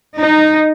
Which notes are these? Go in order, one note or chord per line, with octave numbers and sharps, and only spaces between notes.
D#4